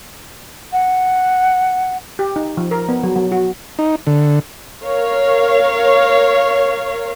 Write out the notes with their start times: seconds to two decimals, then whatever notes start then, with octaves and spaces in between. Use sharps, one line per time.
0.73 F#5
2.19 G4
2.36 D#4
2.57 F3
2.71 A#4
2.89 B3
3.03 F#3
3.16 F#3
3.32 F#4
3.79 D#4
4.07 D3
4.83 A#4 C#5 F5